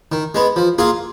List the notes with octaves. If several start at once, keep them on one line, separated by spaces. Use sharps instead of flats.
D#3
G#3 B3
F3
A#3 F4 G#4